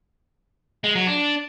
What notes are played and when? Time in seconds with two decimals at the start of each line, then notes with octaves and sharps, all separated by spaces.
0.84 G#3
0.95 F#3
1.07 D4